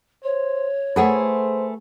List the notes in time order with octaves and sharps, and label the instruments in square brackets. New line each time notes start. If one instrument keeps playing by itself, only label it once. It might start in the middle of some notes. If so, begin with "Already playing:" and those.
[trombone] C5 [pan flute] C#5
[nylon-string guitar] A3 G#4 B4 [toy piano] E4 A4 F#5 [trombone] C5